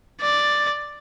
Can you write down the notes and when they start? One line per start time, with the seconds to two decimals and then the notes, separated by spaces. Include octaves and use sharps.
0.21 D5